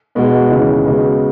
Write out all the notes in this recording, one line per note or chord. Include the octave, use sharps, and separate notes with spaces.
B2 G#3 B3 F#4
D#2 C#3 E3 G#3 C#4
C#3 G#3 B3 F#4